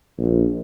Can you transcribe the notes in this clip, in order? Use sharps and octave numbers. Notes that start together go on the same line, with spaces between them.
A#1